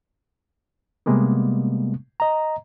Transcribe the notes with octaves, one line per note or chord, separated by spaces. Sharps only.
C3 G3 G#3 A#3 B3
D#5 A#5